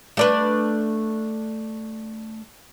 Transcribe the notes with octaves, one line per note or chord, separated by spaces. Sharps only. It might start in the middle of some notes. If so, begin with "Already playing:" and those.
A3 D4 B4